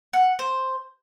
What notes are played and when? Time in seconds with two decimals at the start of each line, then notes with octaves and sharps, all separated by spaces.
0.13 F#5
0.39 C5